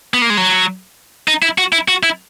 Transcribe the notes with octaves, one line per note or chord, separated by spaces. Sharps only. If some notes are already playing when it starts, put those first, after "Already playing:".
B3
A#3
G#3
F#3
D#4
E4
F#4
E4
F#4
E4